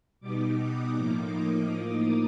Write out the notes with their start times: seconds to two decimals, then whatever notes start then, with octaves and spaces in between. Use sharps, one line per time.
0.20 B2 G3 B3 D#4 D6
0.58 D#6
0.95 A2 F3 A#3 D#4 D6
1.33 D#6